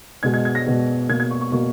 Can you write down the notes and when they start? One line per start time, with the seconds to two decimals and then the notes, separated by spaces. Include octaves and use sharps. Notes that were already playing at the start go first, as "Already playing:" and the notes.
0.23 B2 G#3 G#6
0.34 G#6
0.45 G#6
0.55 A#6
0.66 B2 G#3
1.09 B2 A#3 G#6
1.20 G#6
1.31 C#6
1.41 C#6
1.52 B2 A#3 C#6